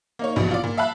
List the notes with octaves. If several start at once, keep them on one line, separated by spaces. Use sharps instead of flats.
A#3 D#4 C#5
A#1 B2 E3
F4 D5
A#2
E5 F5 A5 B5 F#6